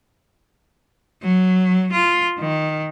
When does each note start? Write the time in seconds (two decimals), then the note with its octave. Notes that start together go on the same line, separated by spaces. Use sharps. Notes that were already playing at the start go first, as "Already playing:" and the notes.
1.22 F#3
1.92 F4
2.39 D#3